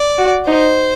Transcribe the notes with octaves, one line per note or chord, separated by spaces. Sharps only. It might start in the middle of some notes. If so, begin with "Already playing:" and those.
Already playing: D5
F#4
D#4 C5